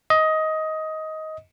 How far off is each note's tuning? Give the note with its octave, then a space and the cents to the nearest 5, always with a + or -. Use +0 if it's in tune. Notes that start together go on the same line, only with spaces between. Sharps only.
D#5 +15